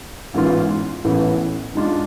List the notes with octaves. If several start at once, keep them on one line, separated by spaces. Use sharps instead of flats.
A1 G#2 E3 B3 F4
A1 A2 E3 B3
G#2 G#3 D4 F4